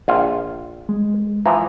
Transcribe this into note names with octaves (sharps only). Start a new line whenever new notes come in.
A#1 F4
G#3
E3 F3 A#5